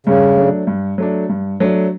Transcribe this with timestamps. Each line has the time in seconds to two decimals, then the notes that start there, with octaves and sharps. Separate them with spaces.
0.07 G2 C#3
0.37 F#3 A3 D4
0.67 G2
0.98 F#3 A3 D4
1.29 G2
1.60 F#3 A3 D4